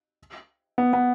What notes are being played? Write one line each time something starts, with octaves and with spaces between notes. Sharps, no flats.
B3
B3